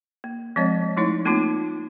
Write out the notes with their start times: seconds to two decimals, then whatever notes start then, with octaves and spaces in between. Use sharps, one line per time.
0.24 A#3
0.56 F3 G#3 C4 C#5 D#5
0.97 F3 A3 D#4 E4 C#5
1.25 A3 A#3 C4 D#4 F4